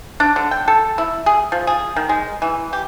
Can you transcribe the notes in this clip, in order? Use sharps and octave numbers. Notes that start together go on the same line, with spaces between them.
D4
D3
G5
A4
E4
G#4
F3
G#4
D#3
G#3
E3
G4